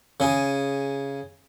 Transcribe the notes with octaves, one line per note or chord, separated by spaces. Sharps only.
C#3 G#4